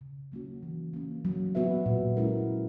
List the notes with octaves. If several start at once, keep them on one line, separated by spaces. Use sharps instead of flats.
C#3
F#3 A#3 C#4 F#4
E3
A#3 C#4
F#3
B3 F#4 B4 E5
A#2
G#3 C#4 E4 A#4
F#3